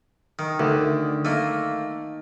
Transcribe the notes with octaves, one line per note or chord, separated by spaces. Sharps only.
D#3
D2 D3 D#3
A3 A#3 D#5